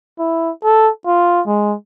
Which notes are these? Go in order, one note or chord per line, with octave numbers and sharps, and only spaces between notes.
E4
A4
F4
G#3